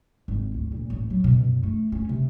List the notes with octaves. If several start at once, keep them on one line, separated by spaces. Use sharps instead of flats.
G#1
D2
A#2
A1
F#3
B2
F#2
A3
C#4
C3